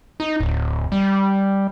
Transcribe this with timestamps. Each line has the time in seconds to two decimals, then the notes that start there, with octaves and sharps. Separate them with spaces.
0.20 D#4
0.40 D1
0.92 G3